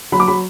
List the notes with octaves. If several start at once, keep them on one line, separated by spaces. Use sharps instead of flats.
F#3 B5
D6
F#3 B5